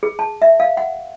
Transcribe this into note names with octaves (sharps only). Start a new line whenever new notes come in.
G#4
A5
E5
F5
F#5